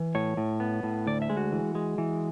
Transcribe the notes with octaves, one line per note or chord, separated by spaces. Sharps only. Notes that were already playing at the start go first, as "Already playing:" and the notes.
Already playing: E3
A2 C#5
A2
B3
A2
D2 D5
E5
G#3
F#4
E3
G#3
E3